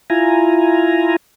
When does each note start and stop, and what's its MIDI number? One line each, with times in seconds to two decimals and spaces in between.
0.10 1.16 64
0.10 1.16 65
0.10 1.16 80
0.10 1.16 82